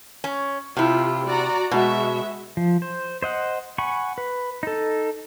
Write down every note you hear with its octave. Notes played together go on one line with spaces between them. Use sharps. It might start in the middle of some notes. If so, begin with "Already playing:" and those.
C#4
C3 E4 F4 G4
F#4 D5 A#5
B2 G#3 F#4 E5
F3
C5
C5 D#5 F#5
F#5 G#5 B5 C#6
B4
D#4 A4